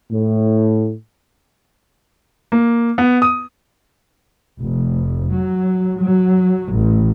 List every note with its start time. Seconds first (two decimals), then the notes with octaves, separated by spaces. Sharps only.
0.12 A2
2.52 A#3
2.98 B3
3.22 D#6
4.61 F1
5.34 F#3
6.00 F#3
6.73 A1